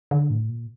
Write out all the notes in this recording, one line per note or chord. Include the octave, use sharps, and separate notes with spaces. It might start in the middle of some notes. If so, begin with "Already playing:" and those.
D3
A2
A#2